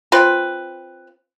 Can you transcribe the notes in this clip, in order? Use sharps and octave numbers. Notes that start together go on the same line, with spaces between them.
C4 F4 B4